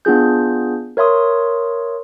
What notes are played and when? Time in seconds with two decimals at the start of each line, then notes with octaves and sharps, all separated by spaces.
0.05 B3 D4 F4 G#4 G6
0.97 A#4 C#5 E5 C6 D#6